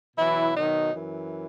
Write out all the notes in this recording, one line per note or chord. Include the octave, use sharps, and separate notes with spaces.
B2 E3 F#3 E4
D#3 D#4
F#2 E3